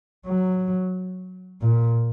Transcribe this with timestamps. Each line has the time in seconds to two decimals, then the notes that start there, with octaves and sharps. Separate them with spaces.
0.26 F#3
1.62 A#2